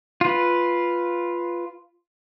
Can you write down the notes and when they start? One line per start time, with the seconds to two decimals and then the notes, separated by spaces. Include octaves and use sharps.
0.21 F4 B4